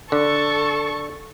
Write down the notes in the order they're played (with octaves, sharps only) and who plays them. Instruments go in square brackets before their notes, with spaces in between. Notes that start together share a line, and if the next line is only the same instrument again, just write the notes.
[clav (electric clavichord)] D3 [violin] A4 C#6